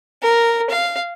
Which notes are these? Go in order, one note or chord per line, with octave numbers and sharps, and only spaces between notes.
A#4
F5